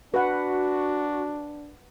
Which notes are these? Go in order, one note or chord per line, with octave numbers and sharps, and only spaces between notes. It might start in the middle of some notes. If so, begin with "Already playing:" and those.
D4 F#4 B4 F#5